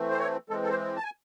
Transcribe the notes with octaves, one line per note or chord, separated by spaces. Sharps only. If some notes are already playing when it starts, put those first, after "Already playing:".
Already playing: E3 A3 C4
C5
C#5
E3 G#3 C4 A4
A4
C5
A5
G#5